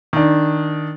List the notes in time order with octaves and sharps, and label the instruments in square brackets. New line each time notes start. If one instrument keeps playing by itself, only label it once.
[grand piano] D#3 D4